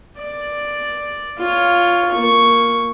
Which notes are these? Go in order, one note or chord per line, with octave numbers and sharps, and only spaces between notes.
D5
F4 C#5
A#3 C#6